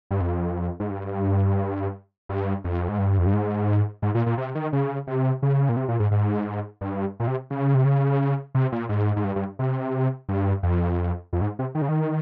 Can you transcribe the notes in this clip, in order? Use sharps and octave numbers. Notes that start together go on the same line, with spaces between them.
G2
F2
G#2
G2
G2
F2
G#2
G2
F2
G2
G#2
G#2
A#2
A#2
C3
D#3
C#3
C3
C#3
A#2
C3
A#2
G#2
G#2
G2
A#2
C3
C#3
C3
C#3
C3
A#2
G#2
G#2
G2
G2
C3
G2
F2
F2
G#2
C3
D#3
C#3
D#3